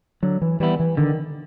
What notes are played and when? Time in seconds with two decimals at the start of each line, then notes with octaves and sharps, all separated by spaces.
0.23 D3 F#3
0.42 E3
0.60 E3 G3 B3 E4
0.80 E3
0.97 D3 D#3